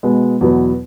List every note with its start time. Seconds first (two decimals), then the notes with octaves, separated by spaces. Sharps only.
0.03 B2 G#3 B3
0.41 E2 B2 F#3 B3